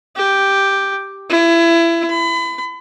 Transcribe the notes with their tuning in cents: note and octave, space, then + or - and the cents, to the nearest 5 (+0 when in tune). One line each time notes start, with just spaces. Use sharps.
G4 +0
E4 +25
B5 +35